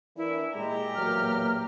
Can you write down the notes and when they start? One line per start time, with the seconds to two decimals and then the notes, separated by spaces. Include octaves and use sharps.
0.17 E3 A#3 D4 E4
0.56 A#2 G#3 G4 A#5
0.95 E2 F#3 A#3 F6